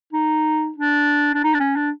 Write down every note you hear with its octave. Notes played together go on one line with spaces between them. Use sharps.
D#4
D4
D4
D#4
D4
C#4
D4